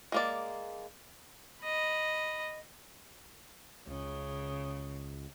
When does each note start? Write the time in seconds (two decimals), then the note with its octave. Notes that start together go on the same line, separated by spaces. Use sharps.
0.12 G#3 A#3 D5
1.62 D#5 B5
3.87 C#2 C#3